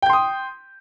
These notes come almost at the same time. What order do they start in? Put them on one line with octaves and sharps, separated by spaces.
G5 G6 C6 D#6